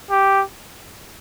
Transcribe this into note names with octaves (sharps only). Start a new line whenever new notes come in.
G4